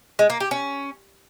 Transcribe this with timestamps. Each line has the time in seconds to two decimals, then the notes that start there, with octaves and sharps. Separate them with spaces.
0.19 G#3
0.30 A#3
0.40 G4
0.51 C#4